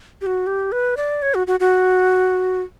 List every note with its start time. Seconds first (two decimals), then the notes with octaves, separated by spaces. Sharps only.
0.21 G4
0.26 F#4
0.47 G4
0.72 B4
0.97 D5
1.22 C#5
1.34 F#4
1.47 F#4
1.60 F#4